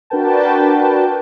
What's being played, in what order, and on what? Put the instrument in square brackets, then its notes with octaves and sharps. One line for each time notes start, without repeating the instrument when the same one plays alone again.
[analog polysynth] D4 F#4 A#4 B4 G5 A5